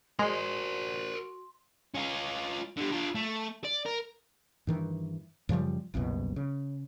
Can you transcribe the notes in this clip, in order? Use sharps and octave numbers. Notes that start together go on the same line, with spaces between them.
G#3 F#4 A#4 C5 C6
C#4 F4
D3 G3
D4 F4
A3
D5
A#4
G2 D#3 E3
F#2 C#3 F3 G3
F#1 C2 F#2 B2
C#3